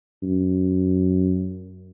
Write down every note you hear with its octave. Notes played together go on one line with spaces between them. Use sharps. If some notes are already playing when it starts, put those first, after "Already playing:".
F#2